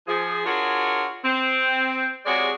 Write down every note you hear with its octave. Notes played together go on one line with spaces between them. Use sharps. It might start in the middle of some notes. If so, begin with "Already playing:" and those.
F3 G#4
D4 F4 F#4 G#4 A#4 C#5
C4
C3 G#3 F#4 G#4 C#5 D5